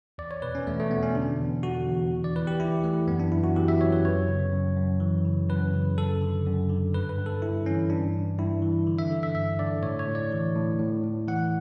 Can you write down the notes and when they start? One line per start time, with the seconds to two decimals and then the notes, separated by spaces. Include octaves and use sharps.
0.18 E2 D5
0.31 C#5
0.42 B2 B4
0.55 C#4
0.67 E2 A3
0.79 A3
0.91 B2 B3
1.02 C#4
1.15 D3 D4
1.39 E2
1.63 D3 F#4
1.87 E2
2.12 E3
2.24 D5
2.36 E3 B4
2.47 G4
2.60 E3 E4
2.83 E3 A3
3.08 F#2 B3
3.20 D4
3.32 F#2 E4
3.44 F#4
3.56 E3 G4
3.68 E5
3.80 F#2 C#5
3.92 B4
4.05 F#2 C#5
4.28 C#3
4.52 F#2
4.77 F#2
5.00 E3
5.25 C#3
5.49 F#2 B4
5.73 C#3
5.97 F#2 A4
6.22 D3
6.46 F#2
6.69 D3
6.93 G2 B4
7.09 B4
7.18 G2
7.26 A4
7.42 G2 E4
7.66 E3 C#4
7.90 G2 D4
8.14 G2
8.38 G2 E4
8.62 E3
8.87 D3
8.99 E5
9.11 D3
9.23 E5
9.35 G2 E5
9.59 D3 D5
9.82 A2 C#5
9.99 C#5
10.07 A2
10.15 D5
10.31 E3
10.55 A2
10.80 A2
11.04 A2
11.28 E3 F#5